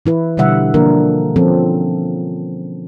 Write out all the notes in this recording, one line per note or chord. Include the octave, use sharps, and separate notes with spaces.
E3 E4 B4
B2 D3 G3 E5 F#5
D3 F3 A#3 D4 A#4
F3 C4 C#4 A4